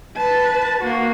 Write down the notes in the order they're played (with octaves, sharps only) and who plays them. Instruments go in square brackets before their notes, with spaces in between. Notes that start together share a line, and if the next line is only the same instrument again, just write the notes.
[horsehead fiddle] B4 A5
A#3 F#4